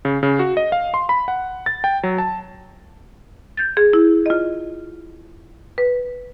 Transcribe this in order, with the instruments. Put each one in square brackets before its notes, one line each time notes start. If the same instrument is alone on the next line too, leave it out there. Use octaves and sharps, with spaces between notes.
[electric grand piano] C#3
C#3
F#4
D#5
F5
C6
B5
F#5
A6
G5
F#3
A5
[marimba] G6 A6
G#4
E4
F4 D#5
B4